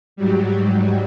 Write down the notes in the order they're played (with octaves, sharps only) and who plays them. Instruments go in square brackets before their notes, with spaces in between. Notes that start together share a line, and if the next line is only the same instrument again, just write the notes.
[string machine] G#2 F#3 G3